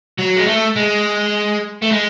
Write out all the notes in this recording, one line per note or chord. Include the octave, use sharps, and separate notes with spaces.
F#3
G#3
A3
G#3
A3
G#3